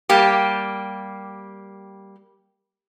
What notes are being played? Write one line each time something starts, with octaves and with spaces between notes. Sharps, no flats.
G3 A#3 G4